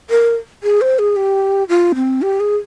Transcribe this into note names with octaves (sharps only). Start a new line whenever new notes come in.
A#4
G#4
C5
G#4
G4
F4
C4
G4
G#4